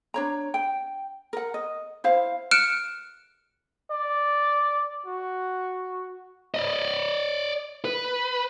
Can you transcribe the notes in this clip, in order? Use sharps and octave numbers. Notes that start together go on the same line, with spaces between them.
D4 C#5 A#5
G5
A#4 F#5
D#5
E4 C5 F5
F6 F#6 C#7 D7 E7
D5
F#4
D5 D#5
B4